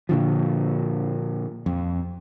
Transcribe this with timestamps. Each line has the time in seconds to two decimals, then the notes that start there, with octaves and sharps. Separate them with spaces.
0.09 A#2 D3 F3
1.66 F2